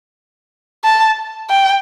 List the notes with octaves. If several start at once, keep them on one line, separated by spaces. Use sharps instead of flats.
A5
G5